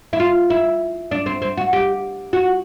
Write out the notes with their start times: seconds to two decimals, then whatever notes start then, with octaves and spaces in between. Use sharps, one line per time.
0.13 E4
0.20 F4
0.50 E4
1.11 D4
1.26 C4
1.42 C4
1.57 F#4
1.73 G4
2.33 F#4